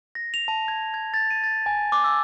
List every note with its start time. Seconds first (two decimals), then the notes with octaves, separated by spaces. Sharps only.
0.15 A#6
0.34 F7
0.48 A5
0.68 G#6
0.94 G#6
1.14 A6
1.30 D#7
1.44 A6
1.66 G#5
1.92 D6
2.04 E6